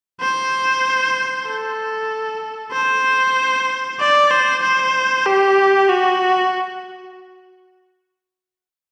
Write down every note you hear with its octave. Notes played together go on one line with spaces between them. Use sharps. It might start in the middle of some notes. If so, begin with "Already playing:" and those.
C5
A4
C5
D5
C5
C5
G4
F#4